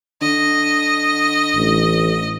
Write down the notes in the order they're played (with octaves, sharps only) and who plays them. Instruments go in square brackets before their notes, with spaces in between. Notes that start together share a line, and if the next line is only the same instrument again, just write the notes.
[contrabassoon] D3 [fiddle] D#5
[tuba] A1